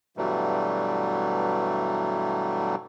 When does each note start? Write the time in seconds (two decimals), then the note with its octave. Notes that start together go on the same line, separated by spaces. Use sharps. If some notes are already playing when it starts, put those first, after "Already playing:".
0.17 G2 B2 E3 F#3 G3 A3